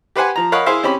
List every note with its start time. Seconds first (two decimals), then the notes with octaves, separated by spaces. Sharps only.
0.16 G4 B4 C5 F#5 G#5
0.36 F3 A#5
0.52 A#4 C#5 D#5 F5 F#5 B5
0.66 E4 G#4 C5 E5 F5
0.83 C4 C#4 G4 B5